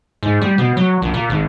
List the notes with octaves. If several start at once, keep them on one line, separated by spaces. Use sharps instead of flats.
G#2
G3
B2
F#3
A#1
A#2
G#1